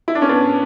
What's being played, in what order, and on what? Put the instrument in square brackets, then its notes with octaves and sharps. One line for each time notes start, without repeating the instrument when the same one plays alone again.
[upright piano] E4
D4
C#4
B3 D4